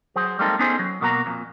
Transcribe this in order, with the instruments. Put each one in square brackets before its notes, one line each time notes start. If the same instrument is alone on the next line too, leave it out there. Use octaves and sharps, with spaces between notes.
[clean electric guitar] F#3 G#4 C5
G3 G#3 A#3 C4 D#4 A4
B3 C#4 D#4 G#4 A4 C5
F#3
B2 A#3 F#4 A#5
F2 A#2